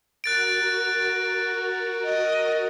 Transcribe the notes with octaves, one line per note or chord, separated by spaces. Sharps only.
F#4 A#4 F#6 A6 D7
D#5